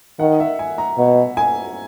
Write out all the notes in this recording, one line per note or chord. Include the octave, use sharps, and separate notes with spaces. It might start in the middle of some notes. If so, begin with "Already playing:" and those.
D#3 F#5
E5
G#5
A#5
B2
G#5